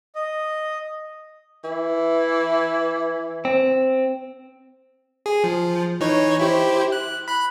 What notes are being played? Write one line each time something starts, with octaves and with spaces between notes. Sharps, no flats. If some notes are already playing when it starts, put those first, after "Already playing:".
D#5
E3
C4
G#4
F3
E3 D#4 C#5
E4 G4 C5
F#6
B5 F#6